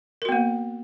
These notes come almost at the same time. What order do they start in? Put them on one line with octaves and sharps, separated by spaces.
A#4 F#4 B3 A#3